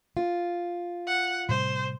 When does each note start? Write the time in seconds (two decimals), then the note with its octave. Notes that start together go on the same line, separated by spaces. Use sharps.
0.17 F4
1.07 F#5
1.49 A2 C3 G3 C5